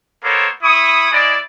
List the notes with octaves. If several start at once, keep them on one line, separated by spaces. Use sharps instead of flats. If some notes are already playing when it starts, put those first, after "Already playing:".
A#3 B3 A4 C5 C#5
E4 B5 C#6 D#6
G#3 E4 D5